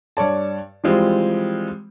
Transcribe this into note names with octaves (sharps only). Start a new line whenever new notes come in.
G2 C#5 D5 A5
E3 F3 G3 G#3 C4 F4